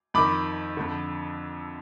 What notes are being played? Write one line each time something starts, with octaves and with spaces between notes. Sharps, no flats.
F2 D#3 B5 D6
F2 D3